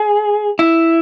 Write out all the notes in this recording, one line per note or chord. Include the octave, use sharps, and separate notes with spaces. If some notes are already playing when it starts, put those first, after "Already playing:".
Already playing: G#4
E4